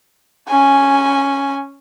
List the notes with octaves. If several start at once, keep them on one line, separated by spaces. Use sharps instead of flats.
C#4 G#5